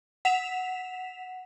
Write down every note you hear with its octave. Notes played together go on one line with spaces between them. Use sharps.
F#5 B6 E7 F7